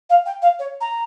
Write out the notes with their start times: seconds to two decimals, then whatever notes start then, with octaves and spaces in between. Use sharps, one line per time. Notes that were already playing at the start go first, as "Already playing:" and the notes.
0.10 F5
0.26 G5
0.42 F5
0.59 C#5
0.81 A#5